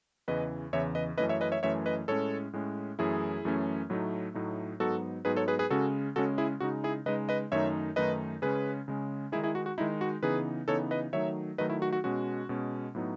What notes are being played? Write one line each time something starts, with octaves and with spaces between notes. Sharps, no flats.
E2 C#3 E3 B4 D#5
E2 C#3 E3 C#5 E5
B4 D#5
F#2 E3 A3 C#4 B4 D#5
C#5 E5
B4 D#5
C#5 E5
F#2 E3 A3 C#4 C#5 E5
B4 D#5
A2 G#3 C#4 A4 C#5
A2 G#3 C#4
F#2 E3 A3 C#4 E4 G#4
F#2 E3 A3 C#4
A2 F#3 A3 D#4
A2 F#3 A3 D#4
G#2 F#3 B3 D#4 F#4 A4
G#2 F#3 B3 D#4 G#4 B4
A4 C#5
G#4 B4
G#4 B4
C#3 G#3 C#4 F#4 A4
C#3 G#3 C#4 F#4 A4
E4 G#4
C#3 G#3 D#4 F#4
E4 G#4
C#3 G#3 D#4 B4 D#5
B4 D#5
F#2 D#3 A3 D#4 C#5 E5
F#2 D#3 A3 D#4 B4 D#5
C#3 G#3 C#4 G#4 B4
C#3 G#3 C#4
D#3 G#3 D#4 E4 G#4
E4 G#4
F#4
F#4
D#3 G#3 D#4 E4
F#4
C#3 E3 B3 D#4 G#4 B4
C#3 E3 B3 D#4 A4 C#5
B4 D#5
D#3 F#3 A3 D#4 C#5 E5
D#3 F#3 A3 D#4 B4 D#5
E4
F#4
F#4
B2 G#3 C#4 F#4
B2 G#3 C#4
A2 F#3 B3 D#4